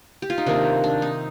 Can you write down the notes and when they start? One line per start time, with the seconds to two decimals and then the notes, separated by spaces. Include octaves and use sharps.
0.22 G4
0.30 F4
0.38 D#4
0.46 C3 D#3 A#3 D4
0.84 D4
1.02 D#4